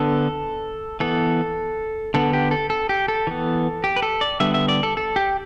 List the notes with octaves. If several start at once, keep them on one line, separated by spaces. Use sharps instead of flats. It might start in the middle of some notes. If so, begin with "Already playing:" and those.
Already playing: D3 B3 A4
E3 B3 A4
D3 B3 A4
G4
A4
A4
G4
A4
E3 B3
G4
B4
A4
D5
D3 G3 B3 E5
E5
D5
A4
A4
G4